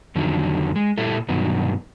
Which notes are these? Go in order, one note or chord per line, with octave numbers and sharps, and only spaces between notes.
F2 D3 D#3 F#3
G#3
A#2 G3 E4 A4
G2 B2 D#3 F#3